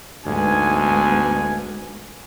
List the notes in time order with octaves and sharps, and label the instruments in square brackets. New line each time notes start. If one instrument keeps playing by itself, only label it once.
[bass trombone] D2 [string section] G#2 B3 [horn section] G#5